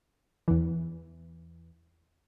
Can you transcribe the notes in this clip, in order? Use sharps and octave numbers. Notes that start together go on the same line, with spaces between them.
E2 E3